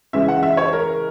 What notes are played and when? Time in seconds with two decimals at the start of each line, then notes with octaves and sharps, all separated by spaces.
0.13 C#3 E3 G#3 C#4 E5
0.28 F#5
0.43 E5
0.57 C#5
0.73 A#4